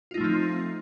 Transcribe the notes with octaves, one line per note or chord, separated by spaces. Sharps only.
F3 A3 C4 D#4 F4